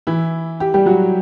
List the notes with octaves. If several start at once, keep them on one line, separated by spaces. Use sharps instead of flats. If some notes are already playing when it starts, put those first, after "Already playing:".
E3 E4
G4
G3 G4
F#3 F#4